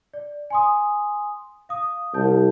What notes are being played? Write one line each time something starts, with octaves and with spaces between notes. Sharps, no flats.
D5
G#5 C6 D#6
F5 D#6
C2 E4 A5 G6